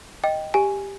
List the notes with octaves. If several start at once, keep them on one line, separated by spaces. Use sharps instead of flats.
D#5 G5
G4 G#5